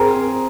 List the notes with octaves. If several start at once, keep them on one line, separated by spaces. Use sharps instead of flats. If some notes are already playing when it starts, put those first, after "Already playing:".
Already playing: C4 G#4 A#4